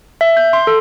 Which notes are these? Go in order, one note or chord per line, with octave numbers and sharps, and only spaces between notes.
E5
G6
C6
A4